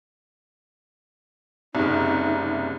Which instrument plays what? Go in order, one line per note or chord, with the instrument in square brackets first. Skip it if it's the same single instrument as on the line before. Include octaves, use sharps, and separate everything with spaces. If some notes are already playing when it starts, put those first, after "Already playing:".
[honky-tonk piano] F#1 C2 [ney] D#4